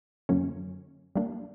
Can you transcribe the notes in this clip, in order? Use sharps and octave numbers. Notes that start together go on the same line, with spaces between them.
F#2 D3 F#3 A#3 C#4
G3 A#3 D4